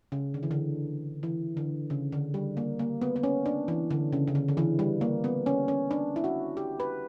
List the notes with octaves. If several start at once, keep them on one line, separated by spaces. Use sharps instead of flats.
C#3
D3
E3
D3
E3
D3
C#3
D3
G3
A#3
A#3
B3
B3
C#4
D4
E3
D3
C#3
C#3
D3
D3
E3
G3
A#3
B3
C#4
C#4
D4
E4
F#4
G4
B4